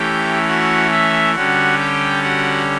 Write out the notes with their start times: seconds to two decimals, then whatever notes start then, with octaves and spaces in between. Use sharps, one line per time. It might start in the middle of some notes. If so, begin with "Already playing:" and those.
Already playing: E3 A3 C#4 G4 G5
0.47 F#4 F#5
0.91 E4 E5
1.35 D3 G3 C#4 F#4 F#5
1.79 G4 G5
2.23 F#4 F#5